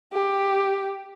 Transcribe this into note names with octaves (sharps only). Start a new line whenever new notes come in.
G4